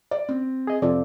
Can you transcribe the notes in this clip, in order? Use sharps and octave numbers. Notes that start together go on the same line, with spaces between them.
D5
C4
G#4 D#5
F2 C3 C4 F4 A4 D5